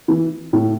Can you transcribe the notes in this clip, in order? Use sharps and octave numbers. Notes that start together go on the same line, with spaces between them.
E3
A2